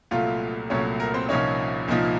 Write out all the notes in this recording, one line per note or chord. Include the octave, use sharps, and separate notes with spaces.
C2 A#2 F#3 A3 F4 F5
C2 A#2 F#3 A3 C#4 C#5
A#4
C4 C5
C2 A#2 F3 A#3 C#4 D#4 C#5
C2 A#2 F3 A#3 D#4